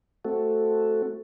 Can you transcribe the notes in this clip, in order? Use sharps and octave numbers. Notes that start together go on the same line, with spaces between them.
A3 C4 F#4 A4